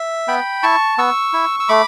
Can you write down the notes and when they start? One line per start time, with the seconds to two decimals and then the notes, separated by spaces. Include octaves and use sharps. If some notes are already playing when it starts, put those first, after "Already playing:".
Already playing: E5
0.28 B3 G5 B5
0.63 E4 A5 C#6
0.98 B3 C#6 E6
1.33 E4
1.60 E6
1.69 A3 B5 D6